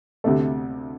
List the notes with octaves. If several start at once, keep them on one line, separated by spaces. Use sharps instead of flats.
D2 C3 A3